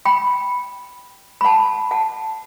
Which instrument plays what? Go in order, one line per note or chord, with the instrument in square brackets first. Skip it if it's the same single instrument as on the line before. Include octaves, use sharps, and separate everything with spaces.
[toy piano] G5 B5
B5
F#5 A5
F#5 A5